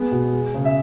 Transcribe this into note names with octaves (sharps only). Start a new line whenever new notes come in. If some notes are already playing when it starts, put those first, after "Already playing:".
Already playing: G#3 B3
B2
G#3
C#3
E5